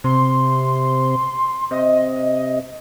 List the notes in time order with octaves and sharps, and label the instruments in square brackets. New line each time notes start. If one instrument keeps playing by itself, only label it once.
[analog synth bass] C3 [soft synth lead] C6
[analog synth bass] C3 [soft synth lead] D#5